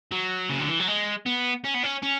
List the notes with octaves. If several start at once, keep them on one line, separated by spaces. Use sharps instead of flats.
F#3
C#3
D3
E3
F#3
G#3
B3
C#4
B3
C#4
C#4